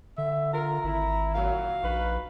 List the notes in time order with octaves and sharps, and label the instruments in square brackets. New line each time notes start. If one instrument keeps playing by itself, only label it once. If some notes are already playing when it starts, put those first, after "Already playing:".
[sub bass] D3 [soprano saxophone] E5
[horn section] F4 A#4 [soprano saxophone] A#5
[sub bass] G#1 [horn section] E4
[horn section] A#2 F#3 [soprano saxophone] F5
[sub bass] A#1 [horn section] D#4 F#4 B4